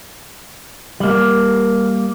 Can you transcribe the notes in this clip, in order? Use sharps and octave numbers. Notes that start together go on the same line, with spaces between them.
G3 A#3